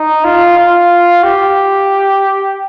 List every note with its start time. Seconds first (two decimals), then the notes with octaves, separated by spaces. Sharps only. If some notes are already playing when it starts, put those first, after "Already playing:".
Already playing: D#4
0.24 F4
0.57 F4
1.23 G4